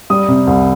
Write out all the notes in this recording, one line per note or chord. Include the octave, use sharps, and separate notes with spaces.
G3 D#6
C3
C2